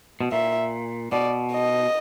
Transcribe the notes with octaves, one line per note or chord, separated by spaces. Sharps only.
B2
A#2 E5
B2 D5
D#5